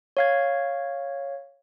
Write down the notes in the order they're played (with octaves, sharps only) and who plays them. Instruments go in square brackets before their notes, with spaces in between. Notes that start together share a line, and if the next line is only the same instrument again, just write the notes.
[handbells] C#5 F5 G#6